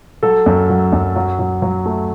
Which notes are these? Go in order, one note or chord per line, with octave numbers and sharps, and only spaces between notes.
F#3 A4
F#2
F#3
F#2
F#3
F#3
F#3
A3